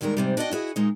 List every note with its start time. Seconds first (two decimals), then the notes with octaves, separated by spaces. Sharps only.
0.01 D#2 D#3 G3 G#3 A#4
0.17 G#2 C3 G3
0.37 D4 E4 F#4 D5 D#5 G5
0.51 E4 F#4 G#4 D#5
0.76 A#2 G#3 D#4